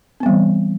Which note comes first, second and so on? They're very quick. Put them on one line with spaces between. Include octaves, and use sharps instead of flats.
C4 B3 G3 E3